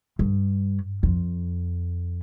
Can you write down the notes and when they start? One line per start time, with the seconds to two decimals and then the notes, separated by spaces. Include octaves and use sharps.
0.19 G2
1.03 F2